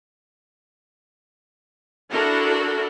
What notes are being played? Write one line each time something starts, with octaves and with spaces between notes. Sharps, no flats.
D4 E4 F#4 A4 A#4